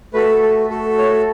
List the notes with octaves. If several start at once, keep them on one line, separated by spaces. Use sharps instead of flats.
A3 F#4 A4 B4
A4
A3 F#4 A4
C#5